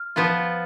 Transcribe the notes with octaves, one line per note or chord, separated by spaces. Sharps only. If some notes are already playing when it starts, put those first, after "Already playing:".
Already playing: F6
F3 B3 F4